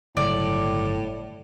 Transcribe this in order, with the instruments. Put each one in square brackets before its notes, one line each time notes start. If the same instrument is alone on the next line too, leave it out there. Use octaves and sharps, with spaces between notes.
[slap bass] G1 C#3 F#3 [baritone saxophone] A2 [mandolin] D5